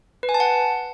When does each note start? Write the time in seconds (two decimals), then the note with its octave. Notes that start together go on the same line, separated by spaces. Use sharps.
0.23 B4
0.29 G#5
0.34 A5
0.40 F#5